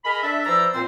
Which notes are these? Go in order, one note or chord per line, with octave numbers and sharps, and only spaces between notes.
G#4 A#4 D#5 B5
D4 A4 E5
E3 F3 C5 D5 A#5 E6
A#2 C4 C5